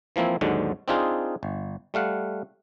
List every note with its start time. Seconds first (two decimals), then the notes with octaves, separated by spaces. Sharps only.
0.16 E3 F3 A#3 C4 E4
0.41 D#2 G#2 D3 F#3 G#3
0.88 C4 D4 D#4 F4 G#4
1.43 G1
1.94 G3 A3 F5 F#5